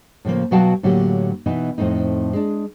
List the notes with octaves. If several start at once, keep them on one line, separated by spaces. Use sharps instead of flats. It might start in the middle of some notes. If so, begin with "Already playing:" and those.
A2 C#3 F3 A#3
B2 F#3 F#4 F5 G5 A5
A2 D3 F#3 A#3 G4
B2 E3 D#4 E4
F2 A2 A3 C4 D#4
G#3 D4